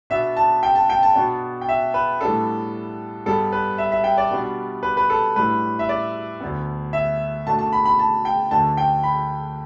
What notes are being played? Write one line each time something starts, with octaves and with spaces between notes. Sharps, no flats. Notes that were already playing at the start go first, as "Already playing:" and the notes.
B2 B3 D4 E5
A5
G5
A5
G5
A5
B2 B3 D4
G5
E5
B4
A2 G3 B3 D4 A4
G2 G3 B3 A4
B4
E5
E5
G5
D5
B2 G3 B3 D4
B4
B4
A4
A2 G3 D4 B4
E5
D5
D2 D3 B3
E5
B2 A3 D4 A5
A5
B5
B5
A5
G5
D2 D3 A3 D4 A5
G5
B5